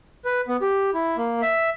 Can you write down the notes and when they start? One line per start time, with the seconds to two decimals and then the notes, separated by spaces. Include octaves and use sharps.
0.25 B4
0.48 B3
0.61 G4
0.94 E4
1.17 A#3
1.42 E5